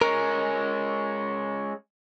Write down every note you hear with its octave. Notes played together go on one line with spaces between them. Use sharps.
G#3 C#4 A#4